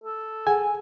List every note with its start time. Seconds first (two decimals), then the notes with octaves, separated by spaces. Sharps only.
0.04 A4
0.47 G#4 F#5 G#5